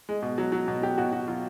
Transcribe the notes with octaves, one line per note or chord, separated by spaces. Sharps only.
G#3
B2
F#3
F#3
B2
F#3 G4
B2 F#4
B2 F#4
F#3 F4